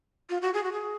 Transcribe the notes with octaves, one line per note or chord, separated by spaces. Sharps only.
F4
F#4
G#4
F#4
G#4